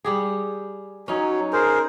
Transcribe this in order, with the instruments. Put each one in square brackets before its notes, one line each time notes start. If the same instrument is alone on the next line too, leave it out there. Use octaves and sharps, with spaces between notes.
[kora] G3 G4 G#4
[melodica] F#3 [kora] C#4 D#4 C#5
[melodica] G#4 A#4 C5